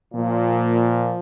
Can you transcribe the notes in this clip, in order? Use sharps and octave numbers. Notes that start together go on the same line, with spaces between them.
A#2 F3